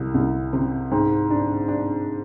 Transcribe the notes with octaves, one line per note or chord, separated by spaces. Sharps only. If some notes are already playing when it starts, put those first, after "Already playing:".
Already playing: C2
C2
C3
G#2
D4
D4